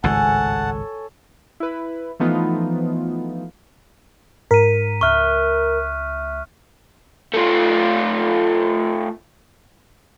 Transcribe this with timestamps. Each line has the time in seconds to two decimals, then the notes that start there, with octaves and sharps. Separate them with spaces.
0.04 G#1 C#2 A2 A4 C#5 F#5 G#5 A5
1.60 E4 B4
2.20 E3 F3 A3 B3 D#4 F4
4.51 G#2 A#4 B6 D#7
5.01 C#2 E5 C#6 F6 F#6
7.34 A3 F4